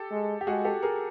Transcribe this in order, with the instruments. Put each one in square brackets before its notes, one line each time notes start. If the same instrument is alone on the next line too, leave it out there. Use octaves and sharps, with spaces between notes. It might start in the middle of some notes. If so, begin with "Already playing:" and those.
Already playing: [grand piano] G4 A4
[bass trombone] G#3
[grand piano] G4
[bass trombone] G#3 [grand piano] F#4 G#4
[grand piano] G4 A4
G#4 A#4